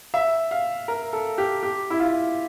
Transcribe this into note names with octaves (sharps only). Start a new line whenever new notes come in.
E5
F5
A#4
A4
G4
G4
E4
F4